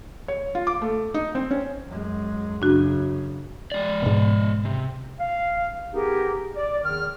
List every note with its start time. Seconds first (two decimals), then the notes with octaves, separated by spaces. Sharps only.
0.28 C#5
0.55 F4
0.67 D6
0.82 A3
1.14 D#4
1.35 C4
1.51 C#4
1.88 F#2 G#3
2.62 F#2 C#3 D4 F#4
3.72 G#3 D5
4.02 G#2 B2
4.65 C3
5.20 F5
5.94 B3 D#4 G4 G#4 A#4
6.56 D5
6.84 E2 D#3 F6